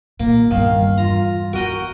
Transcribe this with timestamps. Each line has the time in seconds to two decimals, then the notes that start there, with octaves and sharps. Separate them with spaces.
0.20 A#2 A#3
0.51 E2 G2 D#3 F5
0.98 F4 A#5
1.53 E2 F#4 A#4 D#5 G5